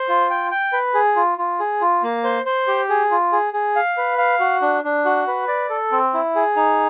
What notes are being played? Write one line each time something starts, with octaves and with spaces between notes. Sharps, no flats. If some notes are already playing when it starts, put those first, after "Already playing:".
Already playing: C5
F4
G5
G5
B4
G#4
F4
F4
G#4
F4
A#3
C5
C5
G4
G#4
F4
G#4
G#4
F5
B4
F5
F#4
D4
D4
F#4
B4
D5
A4
C4
E4
G#4
D#4